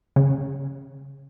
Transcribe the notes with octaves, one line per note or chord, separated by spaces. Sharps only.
C#3